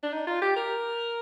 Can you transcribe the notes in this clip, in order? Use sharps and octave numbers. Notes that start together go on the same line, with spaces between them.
D4
D#4
F4
G4
A#4